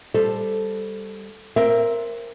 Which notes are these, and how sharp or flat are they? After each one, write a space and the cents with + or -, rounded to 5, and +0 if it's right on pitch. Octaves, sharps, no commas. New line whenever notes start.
G3 +5 A4 +0 C5 +0
C4 +0 A#4 +5 E5 +30